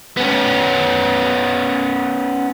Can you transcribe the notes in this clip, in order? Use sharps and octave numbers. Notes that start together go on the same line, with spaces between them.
B3 C#4